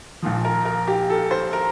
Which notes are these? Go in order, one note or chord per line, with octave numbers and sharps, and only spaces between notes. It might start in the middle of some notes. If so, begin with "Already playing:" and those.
A#1 A#2 F3
A#4
A#4
G4
A4
C5
A#4